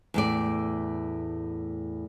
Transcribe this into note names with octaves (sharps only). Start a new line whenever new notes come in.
E2 A2 D5